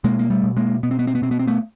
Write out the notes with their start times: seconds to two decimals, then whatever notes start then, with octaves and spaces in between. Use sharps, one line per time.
0.04 B2 G#3 A#3
0.19 A#3
0.30 G3 A3
0.43 B2
0.56 G#3 A#3
0.83 B2 B3
0.91 C4
0.99 B3
1.07 C4
1.15 B3
1.22 B2 C4
1.31 B3
1.39 C4
1.47 A3 B3